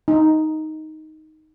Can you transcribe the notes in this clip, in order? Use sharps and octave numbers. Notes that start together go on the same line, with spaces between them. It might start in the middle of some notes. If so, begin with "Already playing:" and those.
D#4